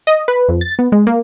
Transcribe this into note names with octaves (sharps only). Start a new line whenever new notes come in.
D#5
B4
F2
A6
B3
G#3
A#3